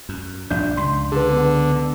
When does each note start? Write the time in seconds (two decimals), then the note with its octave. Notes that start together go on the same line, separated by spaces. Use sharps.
0.09 F#2
0.50 A#1 G2 D4 E5 G6
0.77 C#2 C6
1.12 D3 G#4 B4
1.32 B3